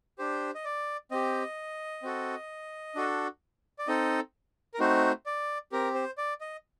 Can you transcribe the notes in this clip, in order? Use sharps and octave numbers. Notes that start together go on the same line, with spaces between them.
D4 G4 C5
D#5
D5
C4 G4 D#5
C4 F#4 A4
D4 F#4 A4
D5
C4 D#4 A4 D#5
A#4
A3 C4 D#4 F#4 C5
D5
C4 G4 A#4
C5
D5
D#5